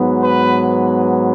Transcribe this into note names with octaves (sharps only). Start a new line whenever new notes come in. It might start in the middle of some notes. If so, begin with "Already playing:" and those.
Already playing: G#2 F#3 B3
B4